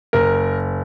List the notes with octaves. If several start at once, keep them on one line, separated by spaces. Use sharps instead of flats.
F#1 A#4